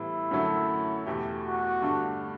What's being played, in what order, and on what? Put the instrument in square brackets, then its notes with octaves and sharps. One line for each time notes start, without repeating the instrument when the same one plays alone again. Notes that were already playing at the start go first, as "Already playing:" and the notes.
Already playing: [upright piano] A2 E3 G3 B3 [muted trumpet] E4
[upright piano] F#2 D3 F#3 A3
E2 B2 A3 E4 G4
[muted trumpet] F#4
[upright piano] G2 D3 A3 D4